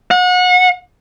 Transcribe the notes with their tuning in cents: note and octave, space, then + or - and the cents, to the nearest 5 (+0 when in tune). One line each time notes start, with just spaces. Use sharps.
F#5 -35